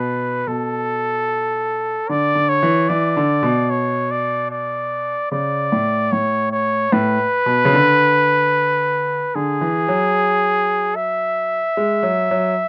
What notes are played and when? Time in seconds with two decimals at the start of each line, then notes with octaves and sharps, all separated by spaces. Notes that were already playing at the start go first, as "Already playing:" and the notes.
Already playing: B2 B4
0.47 B2 A4
2.09 D3 D5
2.35 D3
2.49 C#5
2.63 E3
2.89 E3 D5
3.17 D3
3.43 B2
3.70 C#5
4.11 D5
4.51 D5
5.31 C#3 D5
5.72 A2
6.12 A2 C#5
6.52 C#5
6.92 A2 B4
7.46 B2
7.65 C#3
7.73 D3
9.35 D3 G#4
9.61 E3
9.88 F#3
10.96 E5
11.77 G#3
12.03 F#3
12.31 F#3